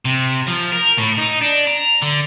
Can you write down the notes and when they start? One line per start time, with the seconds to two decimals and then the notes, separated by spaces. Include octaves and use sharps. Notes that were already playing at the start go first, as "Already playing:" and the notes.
0.05 C3
0.47 F3
0.72 A#4
0.98 A2
1.18 D#4
1.42 D4
1.67 A#5
2.02 D3